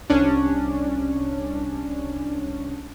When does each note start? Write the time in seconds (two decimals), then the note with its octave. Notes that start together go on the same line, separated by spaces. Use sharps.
0.10 C2 C#4 D4